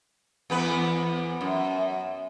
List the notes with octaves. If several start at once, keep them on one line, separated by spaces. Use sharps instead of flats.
E2 B3 B4
F#2